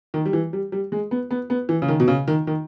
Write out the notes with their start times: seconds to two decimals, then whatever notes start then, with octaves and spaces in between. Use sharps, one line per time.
0.14 D#3
0.25 G3
0.33 E3
0.53 G3
0.72 G3
0.92 G#3
1.11 B3
1.31 B3
1.50 B3
1.69 E3
1.82 C#3
1.88 D#3
2.00 B2
2.08 C#3
2.28 D#3
2.47 D#3